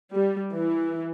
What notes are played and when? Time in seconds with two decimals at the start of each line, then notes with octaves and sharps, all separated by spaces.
0.13 G3
0.52 E3